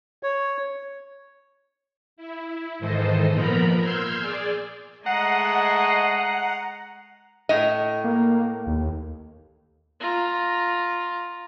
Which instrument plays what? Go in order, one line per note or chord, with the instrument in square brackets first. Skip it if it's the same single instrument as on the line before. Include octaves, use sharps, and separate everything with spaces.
[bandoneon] C#5
[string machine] E4
G#2 D#3 E3 A4 C5 D#5
A#2 F3 B3 A#4 A#5 B5
C6 E6 F6 G6 G#6
G#4 D5
[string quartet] G#3 A3 D#5 [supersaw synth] F#5 [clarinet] A#5 [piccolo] C7
[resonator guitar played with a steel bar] A2 D#5
[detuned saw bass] A#3
D#2
[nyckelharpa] F4 A#5